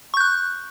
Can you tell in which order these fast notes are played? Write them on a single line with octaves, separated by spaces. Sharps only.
C#6 G6 F#6